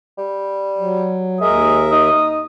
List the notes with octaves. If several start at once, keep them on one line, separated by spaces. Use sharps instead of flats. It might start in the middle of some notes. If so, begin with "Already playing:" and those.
G3
F#3
D#2 G#3 A#4 E5 D#6
D#4 D#6